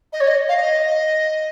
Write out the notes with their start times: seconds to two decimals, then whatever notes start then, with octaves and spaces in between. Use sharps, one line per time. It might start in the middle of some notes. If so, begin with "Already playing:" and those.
0.13 D#5
0.20 C#5
0.27 D#5
0.49 F5
0.57 D#5